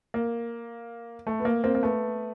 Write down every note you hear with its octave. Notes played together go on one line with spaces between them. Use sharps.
A#3
A3
B3
A#3
A#3 C4
A#3
A3 B3